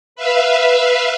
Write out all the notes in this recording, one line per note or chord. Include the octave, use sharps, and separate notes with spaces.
B4 E5 F5